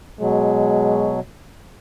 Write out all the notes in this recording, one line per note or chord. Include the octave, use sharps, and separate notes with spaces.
B2 F#3 G#3